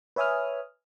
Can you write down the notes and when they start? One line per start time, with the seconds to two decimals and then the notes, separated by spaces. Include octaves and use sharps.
0.16 B4 C#5 E5 G#5 D#6 F6